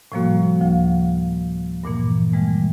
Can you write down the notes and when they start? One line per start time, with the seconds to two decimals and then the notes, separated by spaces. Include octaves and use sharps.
0.12 A2 C3 F3 G3 A#3 F#4
0.60 D2 F3 F5
1.84 G2 A#2 E3 A#3
2.33 C#3 E3 G3 G#3